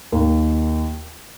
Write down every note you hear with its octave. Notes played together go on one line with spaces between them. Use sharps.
D#2 D#3 A#3